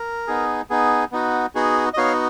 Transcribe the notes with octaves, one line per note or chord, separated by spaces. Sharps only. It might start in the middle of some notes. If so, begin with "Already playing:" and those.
Already playing: A#4
B3 D#4 G#4
B3 D#4 G#4
B3 D#4 F#4
B3 D#4 F#4 G#4
D#5
B3 D#4 F#4 C#5 F5